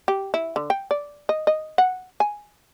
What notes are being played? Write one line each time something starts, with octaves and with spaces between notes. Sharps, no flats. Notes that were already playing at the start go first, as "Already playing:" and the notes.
G4
E4
D3
G5
D5
D#5
D#5
F#5
G#5